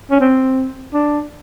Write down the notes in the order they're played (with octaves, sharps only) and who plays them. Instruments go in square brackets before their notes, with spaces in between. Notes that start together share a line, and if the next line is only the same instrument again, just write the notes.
[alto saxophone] C#4
C4
D4